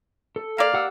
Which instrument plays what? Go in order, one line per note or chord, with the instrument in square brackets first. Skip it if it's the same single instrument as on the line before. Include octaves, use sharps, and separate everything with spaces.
[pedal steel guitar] A4
[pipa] A#3 D5 [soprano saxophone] F5
[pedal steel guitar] G4 F#5 E6